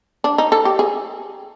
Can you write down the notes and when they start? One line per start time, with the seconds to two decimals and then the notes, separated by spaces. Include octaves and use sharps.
0.24 D4
0.38 D#4
0.52 A4
0.65 G4
0.79 G#4